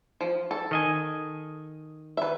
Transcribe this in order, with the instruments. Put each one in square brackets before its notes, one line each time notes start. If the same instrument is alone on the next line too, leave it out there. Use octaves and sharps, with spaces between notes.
[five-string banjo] F3
A4
[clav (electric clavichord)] D#3 D#5 G#5
[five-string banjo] B4 E5